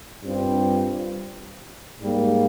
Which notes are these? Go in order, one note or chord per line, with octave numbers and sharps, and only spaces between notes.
G2 G3 C4 F4
G#2 G3 A#3